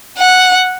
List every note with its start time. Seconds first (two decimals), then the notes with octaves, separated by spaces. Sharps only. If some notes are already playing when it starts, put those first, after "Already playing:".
0.18 F#5